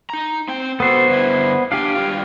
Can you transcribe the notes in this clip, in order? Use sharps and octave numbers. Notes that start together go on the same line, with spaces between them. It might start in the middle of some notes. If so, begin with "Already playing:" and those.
D#4 A#5
C4 G5
B3 F#4 A4 C5
G2 D3 E4
D4 G4 F5 G#5
G2 B2 F4